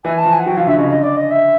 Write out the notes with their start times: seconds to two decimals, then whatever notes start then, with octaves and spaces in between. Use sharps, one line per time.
0.04 E3 G#5
0.18 A5
0.25 F3
0.32 G#5
0.40 F#5
0.46 F#3 G5
0.57 F3 F5
0.67 D3 E5
0.78 C#3 D#5
0.88 D3 D#5
1.02 D5
1.17 D#5
1.31 E5